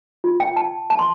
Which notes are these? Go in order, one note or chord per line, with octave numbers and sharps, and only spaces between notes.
F4
G5
A5
A5
C6